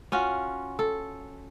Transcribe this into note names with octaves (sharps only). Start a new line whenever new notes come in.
C#4 F4 F#4
A4